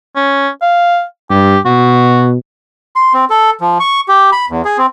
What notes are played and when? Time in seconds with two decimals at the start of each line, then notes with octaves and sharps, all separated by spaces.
0.16 C#4
0.62 F5
1.30 G2 G4
1.66 B2 F#4
2.96 C6
3.14 C4
3.30 A4
3.61 F3
3.80 C#6
4.08 G4
4.32 B5
4.50 E2
4.65 G#4
4.78 C4